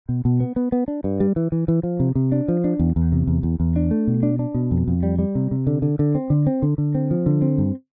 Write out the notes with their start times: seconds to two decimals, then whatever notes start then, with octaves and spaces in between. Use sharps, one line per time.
0.09 B2
0.25 B2
0.40 B3
0.56 B3
0.72 B3
0.88 D4
1.04 G2
1.20 G3
1.36 E3
1.52 E3
1.68 E3
1.83 F3
2.00 C3
2.15 C3
2.32 D4
2.48 F3
2.64 D4
2.79 E2
2.96 E2
3.12 C3
3.27 E2
3.43 E2
3.60 E2
3.76 D4
3.91 A3
4.07 B2
4.23 D4
4.39 D4
4.54 B2
4.71 F2
4.88 F2
5.03 G3
5.19 G3
5.35 C3
5.51 C3
5.67 D3
5.82 D3
5.99 D3
6.15 C4
6.30 D3
6.47 C4
6.62 D3
6.78 D3
6.95 C4
7.11 F3
7.26 D3
7.42 C4
7.58 G2